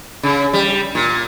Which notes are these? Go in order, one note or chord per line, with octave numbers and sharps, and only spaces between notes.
C#3
G3
A#2